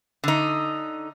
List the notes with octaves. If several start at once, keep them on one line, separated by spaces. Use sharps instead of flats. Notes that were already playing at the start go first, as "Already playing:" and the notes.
D3 D#4